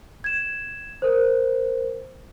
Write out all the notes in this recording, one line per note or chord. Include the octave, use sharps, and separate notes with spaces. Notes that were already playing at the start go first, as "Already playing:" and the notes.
G#6 E7
A#4 C5